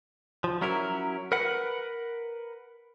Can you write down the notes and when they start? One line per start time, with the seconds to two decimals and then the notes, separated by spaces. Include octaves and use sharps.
0.44 F3
0.62 F#3 C#4 E4 A#4
1.32 A#4 B4 F#5